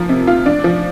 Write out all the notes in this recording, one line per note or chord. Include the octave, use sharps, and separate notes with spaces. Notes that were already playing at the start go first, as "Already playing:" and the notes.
Already playing: F3 A#3
C3
F4
D4
F3